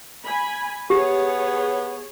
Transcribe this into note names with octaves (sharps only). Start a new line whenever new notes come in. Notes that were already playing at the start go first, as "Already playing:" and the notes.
G#5 B5
B3 G4 G#4 C#5